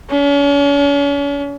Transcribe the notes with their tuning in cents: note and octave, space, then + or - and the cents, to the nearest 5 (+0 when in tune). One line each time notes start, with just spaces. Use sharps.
C#4 +40